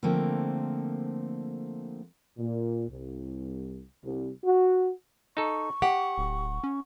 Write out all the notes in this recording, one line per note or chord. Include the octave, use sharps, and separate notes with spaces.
D3 F3 A3 A#3 C4
A#2
C2
C2
F#4
D#4 A4 C#6
G4 F#5
D1
C#4